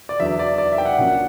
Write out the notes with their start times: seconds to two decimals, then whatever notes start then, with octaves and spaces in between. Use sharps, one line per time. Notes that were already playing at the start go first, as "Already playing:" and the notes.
0.09 D5
0.20 E2 D3 F#3 E5
0.39 D5
0.58 D5
0.72 E5
0.78 G5
0.85 F#5
0.98 A#1 A#2 F#3 C#4 F#5